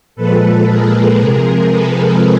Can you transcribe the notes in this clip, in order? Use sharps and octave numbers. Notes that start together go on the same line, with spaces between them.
A#2 F3 G#3 A4 B4
G#4 A#4
C3 F3 G#3 G#4 A#4
A4 B4